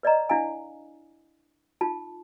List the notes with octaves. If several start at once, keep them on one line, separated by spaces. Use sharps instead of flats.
B4 D5 D#5 A#5
D4 E4 F5 G#5
D#4 F4 A5